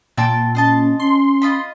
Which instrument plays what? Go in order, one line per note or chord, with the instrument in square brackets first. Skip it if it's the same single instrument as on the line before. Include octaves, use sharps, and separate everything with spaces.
[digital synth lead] A#2 [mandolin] C4 G5 A5
[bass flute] C#4 [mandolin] C5 D#5 A5
[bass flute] C#4 [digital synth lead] C6
[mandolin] F4 D#5 B5